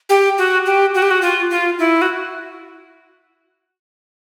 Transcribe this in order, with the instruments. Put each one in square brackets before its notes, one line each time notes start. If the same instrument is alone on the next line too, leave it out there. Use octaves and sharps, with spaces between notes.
[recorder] G4
F#4
G4
F#4
G4
F#4
F4
F4
E4
F#4